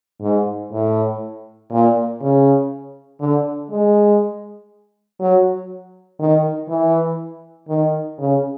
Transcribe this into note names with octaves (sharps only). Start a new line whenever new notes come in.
G#2
A2
A#2
C#3
D3
G#3
F#3
D#3
E3
D#3
C#3